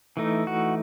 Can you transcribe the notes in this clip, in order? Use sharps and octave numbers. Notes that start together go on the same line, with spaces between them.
E3 A3 D#4
F#4